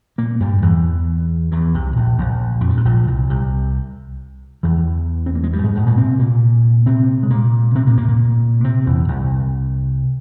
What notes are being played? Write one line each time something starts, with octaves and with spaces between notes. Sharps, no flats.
A#2 A#3
G2 G3
E2 E3
E2 E3
C2 C3
A#1 A#2
A#1 A#2
F2
G2
G#2
A#1 A#2
C2 C3
C2 C3
E2 E3
C4
A#3
G#3
G2 G3
G#2 G#3
G#2 G#3
A#2 A#3
C3 C4
A#2 A#3
C3 C4
G#3
A#2 A#3
C3 C4
A#2 A#3
A#2 A#3
A#2 A#3
C3 C4
E2 E3
C2 C3